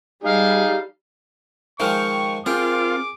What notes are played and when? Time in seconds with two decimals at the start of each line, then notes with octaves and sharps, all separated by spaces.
0.24 G3 D#4 G#4 D#5 F5
1.80 D#3 F3 G#3 G5 C#6 F6
2.46 C4 F4 G#4 A#4 G5 D6